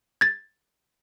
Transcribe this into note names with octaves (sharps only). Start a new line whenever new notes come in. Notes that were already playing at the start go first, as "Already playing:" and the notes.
G#6 A6